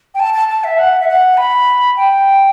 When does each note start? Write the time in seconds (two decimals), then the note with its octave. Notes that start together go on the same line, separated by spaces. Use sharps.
0.15 G5
0.20 A5
0.34 A5
0.49 A5
0.64 E5
0.79 F#5
1.00 E5
1.08 F#5
1.37 B5
1.97 G5